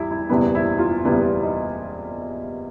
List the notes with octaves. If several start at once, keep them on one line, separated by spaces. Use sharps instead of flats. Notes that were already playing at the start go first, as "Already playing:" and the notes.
Already playing: E2 G3 E4
E4
F#1 E2 B2 G3 B3 E4
E4
F4
F#1 E2 B2 G3 B3 E4
D#4